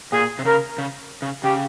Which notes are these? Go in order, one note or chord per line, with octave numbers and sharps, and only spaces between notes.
A#2 G#4
C3
C#3 A#4
C#3
C#3
C#3 G4